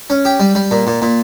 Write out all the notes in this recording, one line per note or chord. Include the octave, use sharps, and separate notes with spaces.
C#4
G4
G3
G3
A#2
A#2
A#2